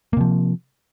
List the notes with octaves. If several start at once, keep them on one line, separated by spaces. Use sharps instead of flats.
C3 F3 A#3